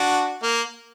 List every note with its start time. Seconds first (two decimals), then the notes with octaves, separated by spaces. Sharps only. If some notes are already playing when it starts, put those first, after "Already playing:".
Already playing: D4 F#4
0.42 A#3